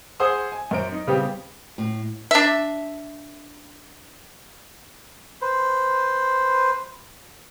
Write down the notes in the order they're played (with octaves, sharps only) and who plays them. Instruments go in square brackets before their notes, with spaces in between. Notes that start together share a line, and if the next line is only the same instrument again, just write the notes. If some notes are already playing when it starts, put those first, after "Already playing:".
[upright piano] G#4 C5 F#5 D#6 E6
G#5
F#2 A#4 C5 D7
D#4
C#3 G3 B3 C4 G4
[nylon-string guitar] A2
[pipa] D4 E5
[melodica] B4 C5